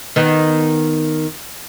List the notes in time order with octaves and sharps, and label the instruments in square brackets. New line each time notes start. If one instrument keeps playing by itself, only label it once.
[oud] D#3 B3